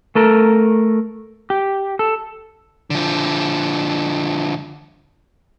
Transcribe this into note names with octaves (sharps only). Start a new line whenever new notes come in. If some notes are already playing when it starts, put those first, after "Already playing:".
A3 A4 A#4
G4
A4
D3 F3